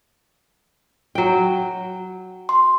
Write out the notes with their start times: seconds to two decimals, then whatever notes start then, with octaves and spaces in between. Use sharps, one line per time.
1.15 F#3 G5
2.49 C6